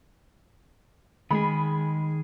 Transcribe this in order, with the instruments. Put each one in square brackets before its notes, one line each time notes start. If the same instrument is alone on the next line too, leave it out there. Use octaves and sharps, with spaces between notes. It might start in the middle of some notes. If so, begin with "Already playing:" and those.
[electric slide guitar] D#3 G#4 [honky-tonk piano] G#3 B5